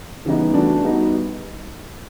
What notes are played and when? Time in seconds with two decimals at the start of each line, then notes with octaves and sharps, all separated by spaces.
0.25 C#3 E3 G3 B3 D#4
0.53 E3 A3 D4 F#4
0.83 G3 B3 D#4 F#4